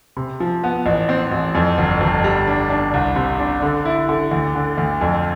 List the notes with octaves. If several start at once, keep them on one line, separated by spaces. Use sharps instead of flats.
C3
F3
B3
A1
C4
A1
F2
G1
G1
G3
D4
D4
C2
C3
D4
D3
E4
D3
D2
D3
D2
F2